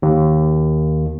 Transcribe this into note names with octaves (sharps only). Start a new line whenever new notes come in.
D#2